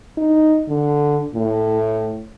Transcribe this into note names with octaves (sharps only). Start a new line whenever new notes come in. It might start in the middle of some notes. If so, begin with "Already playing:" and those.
D#4
D3
A2